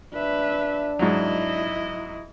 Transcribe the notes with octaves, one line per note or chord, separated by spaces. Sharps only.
D4 B4 E5
G#2 F#3 E4 D#5